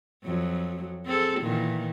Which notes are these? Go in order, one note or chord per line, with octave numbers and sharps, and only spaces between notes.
F2 F#3
C4 G#4 A4
A#2 D#3 E3